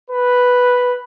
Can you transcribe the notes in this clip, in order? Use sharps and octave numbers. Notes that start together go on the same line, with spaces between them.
B4